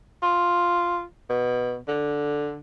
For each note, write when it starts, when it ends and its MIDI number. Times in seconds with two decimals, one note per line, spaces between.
0.22 1.03 65
1.29 1.77 47
1.88 2.57 50